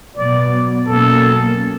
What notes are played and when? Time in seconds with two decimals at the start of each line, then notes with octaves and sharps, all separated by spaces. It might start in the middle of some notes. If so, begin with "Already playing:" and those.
0.16 B2 F#3 B3 D5
0.86 B2 F#3 A#3 C#4 A4